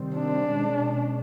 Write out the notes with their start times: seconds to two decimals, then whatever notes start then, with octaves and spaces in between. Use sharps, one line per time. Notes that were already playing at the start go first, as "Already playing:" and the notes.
Already playing: C3 D#3 G3 C4
0.16 D4
0.49 B2 G#3 C#4